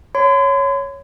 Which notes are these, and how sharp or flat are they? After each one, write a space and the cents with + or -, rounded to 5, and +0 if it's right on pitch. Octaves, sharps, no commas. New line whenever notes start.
C#5 +0 C6 -45